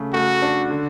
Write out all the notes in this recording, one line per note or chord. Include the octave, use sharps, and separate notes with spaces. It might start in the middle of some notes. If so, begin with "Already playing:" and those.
Already playing: C#3 A3
A3 F#4
D4
D3